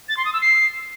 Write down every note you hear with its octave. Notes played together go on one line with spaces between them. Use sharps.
A6
C6
D#6
E6
C7